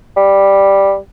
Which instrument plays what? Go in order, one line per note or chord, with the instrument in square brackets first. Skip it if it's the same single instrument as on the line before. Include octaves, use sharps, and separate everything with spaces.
[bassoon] G3